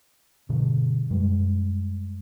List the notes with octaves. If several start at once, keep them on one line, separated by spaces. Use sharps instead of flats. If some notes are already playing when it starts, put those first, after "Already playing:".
G2 B2 D3
F#2 G3 G#3